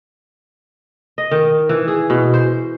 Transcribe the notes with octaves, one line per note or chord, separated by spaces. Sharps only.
D#5
D#3
E3
G#4
B2
C5